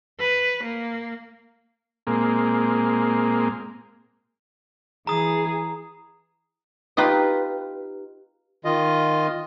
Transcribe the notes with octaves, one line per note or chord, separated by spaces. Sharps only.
B4
A#3
A#2 G#3 A#3 C4
E3 G#4 A#5 D#6
D#4 F4 G4 B4
D#3 F4 D#5